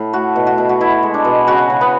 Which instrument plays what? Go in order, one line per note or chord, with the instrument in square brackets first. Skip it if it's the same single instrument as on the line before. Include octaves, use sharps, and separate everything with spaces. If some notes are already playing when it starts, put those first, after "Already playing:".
Already playing: [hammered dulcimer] A2
A3 F#4
B2
F#4
B2
F#4
B2 E4
G#3
D4
B2
C#3 F#4
C#3
B3